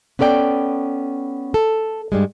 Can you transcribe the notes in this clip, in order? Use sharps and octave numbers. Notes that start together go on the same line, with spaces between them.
B3 C#4 A4 D5 G5
A4
G2 G3 G#3